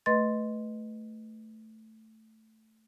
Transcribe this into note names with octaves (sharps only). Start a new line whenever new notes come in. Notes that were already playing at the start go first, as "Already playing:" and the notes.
A3 B4 D#5 C6 A6